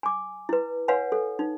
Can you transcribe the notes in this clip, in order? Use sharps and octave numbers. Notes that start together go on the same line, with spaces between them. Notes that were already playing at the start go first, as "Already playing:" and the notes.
G#5 D6
E4 B4
B4 C#5 F5 F#5 G#5
A4
D#4